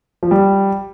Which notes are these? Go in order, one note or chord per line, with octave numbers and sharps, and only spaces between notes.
F3
G3